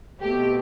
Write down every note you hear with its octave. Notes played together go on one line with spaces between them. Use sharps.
B2 A3 C4 G4